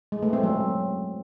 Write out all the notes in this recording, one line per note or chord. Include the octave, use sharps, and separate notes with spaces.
G#3
A3
C4
F#3